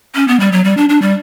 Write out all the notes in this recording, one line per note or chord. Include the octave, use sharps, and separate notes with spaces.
C#4
B3
G3
F#3
G3
D4
D4
G3